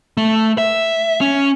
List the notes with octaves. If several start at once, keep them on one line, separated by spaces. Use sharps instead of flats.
A3
E5
C#4